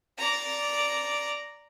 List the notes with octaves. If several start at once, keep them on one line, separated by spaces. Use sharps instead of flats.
D5 A#5